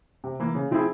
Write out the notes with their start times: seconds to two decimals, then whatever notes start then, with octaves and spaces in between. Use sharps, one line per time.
0.24 C3
0.40 E3 A#3
0.55 C#3
0.71 F3 C4 E4 G#4